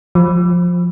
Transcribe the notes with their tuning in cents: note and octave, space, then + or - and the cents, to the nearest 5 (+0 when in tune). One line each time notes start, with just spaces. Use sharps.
F3 +15